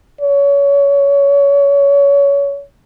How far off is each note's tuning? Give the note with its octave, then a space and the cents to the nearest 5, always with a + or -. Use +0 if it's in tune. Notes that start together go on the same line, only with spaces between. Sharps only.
C#5 +25